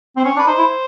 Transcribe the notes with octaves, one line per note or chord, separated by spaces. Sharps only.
C4 C5
C#4 C#5
D4 B4
D#4 C5
E4